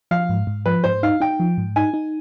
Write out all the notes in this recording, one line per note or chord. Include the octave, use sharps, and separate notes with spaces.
F3 F5
G#2
G#2
F3 B4
G#2 C5
D#4 F5
D#4 G5
F3
G#2
D#4 G#5
D#4